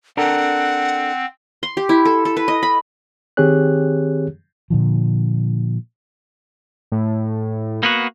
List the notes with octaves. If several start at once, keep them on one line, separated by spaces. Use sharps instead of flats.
C4 D4 A4 A#4 F#5
C6
G4
E4
A4
A4
B4
D#5
B5
D#3 C4 G4 G#4 C#5 F#6
A#2 D3 F3
A2
A#3 B3 F#4